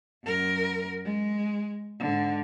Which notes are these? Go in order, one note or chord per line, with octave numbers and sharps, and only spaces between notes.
F#2 A#4
G#3
G#2 D3